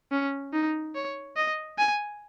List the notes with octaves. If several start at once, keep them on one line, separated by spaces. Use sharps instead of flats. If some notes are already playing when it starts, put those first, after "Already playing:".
C#4
D#4
C#5
D#5
G#5